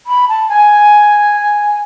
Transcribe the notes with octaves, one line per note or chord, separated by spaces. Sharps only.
B5
A5
G#5